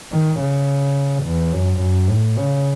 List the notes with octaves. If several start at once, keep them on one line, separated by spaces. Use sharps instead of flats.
D#3
C#3
E2
F#2
F#2
A2
C#3